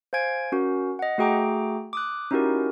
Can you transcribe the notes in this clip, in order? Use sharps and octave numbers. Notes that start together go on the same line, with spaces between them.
C5 F5 G#5 G#6 D7
C#4 F#4 A#4
D#5 F#5
A3 F#4 G#4 G5 A#5 D6
D6 D#6 F#6
C#4 D#4 E4 F#4 G4 A#4